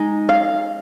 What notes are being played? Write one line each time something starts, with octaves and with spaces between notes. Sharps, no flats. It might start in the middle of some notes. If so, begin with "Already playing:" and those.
Already playing: G#3 D#4
F5